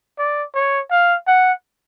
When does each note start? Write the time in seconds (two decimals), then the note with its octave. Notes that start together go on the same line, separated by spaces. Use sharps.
0.19 D5
0.55 C#5
0.91 F5
1.27 F#5